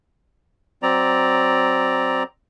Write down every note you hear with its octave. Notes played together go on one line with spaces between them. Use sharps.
F#3 C4 D5 A#5